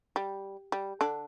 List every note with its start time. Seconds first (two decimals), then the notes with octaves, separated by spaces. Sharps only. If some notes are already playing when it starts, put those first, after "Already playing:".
0.16 G3
0.72 G3
1.01 D3 D4